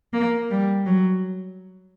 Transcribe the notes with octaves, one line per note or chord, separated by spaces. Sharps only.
A#3
G3
F#3